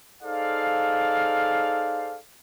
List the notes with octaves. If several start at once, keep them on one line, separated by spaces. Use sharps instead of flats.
D#4 G#4 A4 C5 D5 F5